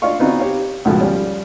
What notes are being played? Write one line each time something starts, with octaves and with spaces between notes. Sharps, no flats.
D4 F4 D5 D#5 F5 C#6
B3 C4 D#4 F4 F#4 B4
G4 C#5 F5
C#2 G#2 B2 F3 A3
F3 G3 C#4